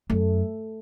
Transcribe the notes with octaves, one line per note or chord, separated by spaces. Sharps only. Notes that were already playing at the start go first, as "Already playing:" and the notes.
F#2 A3